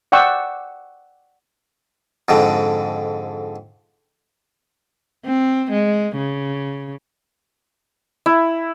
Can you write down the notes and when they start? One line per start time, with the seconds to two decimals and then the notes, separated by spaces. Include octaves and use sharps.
0.12 D5 F#5 G5 C#6 E6
2.28 F2 G#2 D3
5.26 C4
5.72 G#3
6.17 C#3
8.26 E4